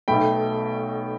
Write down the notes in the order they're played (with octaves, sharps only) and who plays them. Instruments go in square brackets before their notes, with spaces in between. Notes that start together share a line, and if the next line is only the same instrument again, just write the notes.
[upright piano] B1 B2 A3 G5 B5